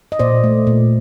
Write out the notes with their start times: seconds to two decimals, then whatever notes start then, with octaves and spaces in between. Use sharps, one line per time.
0.12 D#5
0.19 A#2 C5 D5
0.44 A3
0.67 A#2